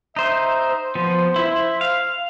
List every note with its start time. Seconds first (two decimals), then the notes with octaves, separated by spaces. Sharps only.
0.16 D#4 C5 E5
0.71 C5
0.95 F3 B3
1.36 E4 E5
1.81 F5